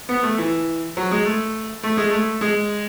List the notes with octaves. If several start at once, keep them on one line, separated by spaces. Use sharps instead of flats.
B3
A3
E3
F#3
G#3
A3
A3
G#3
A3
G#3